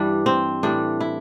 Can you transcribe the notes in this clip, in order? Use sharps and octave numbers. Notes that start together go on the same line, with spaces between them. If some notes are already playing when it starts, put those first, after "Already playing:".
Already playing: G2 E3 G3 D4
C4
A2 E3 G3 D4
E4